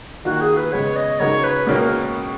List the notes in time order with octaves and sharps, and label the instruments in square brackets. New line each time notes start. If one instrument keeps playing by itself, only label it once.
[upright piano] D#3 A#3 F4 [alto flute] F#4
[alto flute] G#4
B4
[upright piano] C#3 G#3 B3 [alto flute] C#5
[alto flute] D#5
[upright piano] C#3 G#3 D#4 F#4 A#4 [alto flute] C#5
[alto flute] B4
[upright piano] C#2 B2 A#3 C#4 [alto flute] A#4
[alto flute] A#4